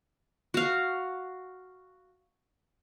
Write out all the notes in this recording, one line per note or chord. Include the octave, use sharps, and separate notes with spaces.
F#4 F5